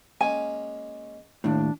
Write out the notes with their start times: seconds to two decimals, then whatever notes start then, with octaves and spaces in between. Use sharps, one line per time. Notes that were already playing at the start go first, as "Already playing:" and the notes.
0.21 G#3 A#3 C#4 G#5
1.44 D#2 A2 D4